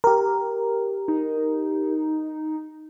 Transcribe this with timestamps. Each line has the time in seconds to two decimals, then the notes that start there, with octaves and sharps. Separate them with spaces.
0.04 G4 A#4
1.08 D#4